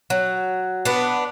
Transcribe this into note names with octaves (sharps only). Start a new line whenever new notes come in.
F#3
B3 D4